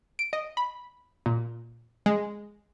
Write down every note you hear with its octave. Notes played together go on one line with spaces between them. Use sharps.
D7
D#5
B5
A#2
G#3